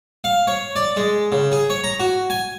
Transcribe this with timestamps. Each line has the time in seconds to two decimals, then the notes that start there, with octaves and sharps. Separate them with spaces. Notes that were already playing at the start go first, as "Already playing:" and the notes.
0.24 F5
0.47 C#5
0.76 D5
0.97 G#3
1.32 C#3
1.52 G#4
1.70 C#5
1.84 A#5
2.00 F#4
2.30 G#5